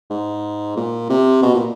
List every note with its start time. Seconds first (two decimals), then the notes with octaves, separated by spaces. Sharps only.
0.10 G#2
0.76 A#2
1.10 C3
1.42 B2
1.54 A#2